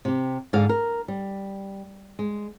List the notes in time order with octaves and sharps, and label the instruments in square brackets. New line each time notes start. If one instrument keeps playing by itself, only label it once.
[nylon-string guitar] C3 G4
G#2 D3 G#4 F5
A#4
G3
G#3